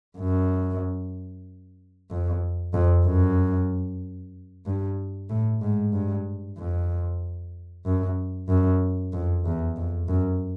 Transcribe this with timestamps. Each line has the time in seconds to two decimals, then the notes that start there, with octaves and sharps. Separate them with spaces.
0.18 F#2
2.11 F2
2.74 F2
3.06 F#2
4.66 G2
5.30 A2
5.61 G#2
5.93 G2
6.58 F2
7.86 F#2
8.49 F#2
9.13 F2
9.45 E2
9.77 F2
10.08 F#2